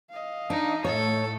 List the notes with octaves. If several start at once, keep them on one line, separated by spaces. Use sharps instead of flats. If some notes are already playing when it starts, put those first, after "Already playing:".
D#5 F5
D4 D#4
A2 A3 A4 C#5